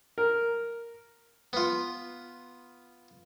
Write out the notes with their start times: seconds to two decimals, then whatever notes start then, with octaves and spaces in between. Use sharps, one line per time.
0.18 A#4
1.53 B3 F4